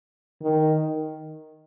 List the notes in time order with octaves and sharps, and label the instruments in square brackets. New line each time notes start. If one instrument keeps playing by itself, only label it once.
[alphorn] D#3